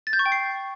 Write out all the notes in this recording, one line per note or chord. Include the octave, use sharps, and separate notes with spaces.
A6
G6
C#6
G5
C7